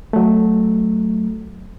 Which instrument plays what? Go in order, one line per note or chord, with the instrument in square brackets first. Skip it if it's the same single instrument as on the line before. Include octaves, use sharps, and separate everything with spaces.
[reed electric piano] F#3 A3